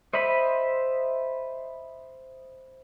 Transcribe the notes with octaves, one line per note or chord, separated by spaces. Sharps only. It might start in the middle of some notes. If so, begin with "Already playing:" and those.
C5 D#5 E5 B5